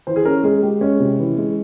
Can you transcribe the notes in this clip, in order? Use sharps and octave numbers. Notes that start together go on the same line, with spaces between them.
E3 C5
G#4
C#4 A#4
G#3 G#4
G#3 G4
G#3 C#4
C3
E3
G#3